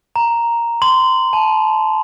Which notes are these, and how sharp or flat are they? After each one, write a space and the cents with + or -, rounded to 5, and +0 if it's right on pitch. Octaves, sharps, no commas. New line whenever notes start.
A#5 +0
C6 -20
A5 -20